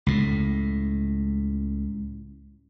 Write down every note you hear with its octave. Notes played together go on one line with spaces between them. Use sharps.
C#2 A2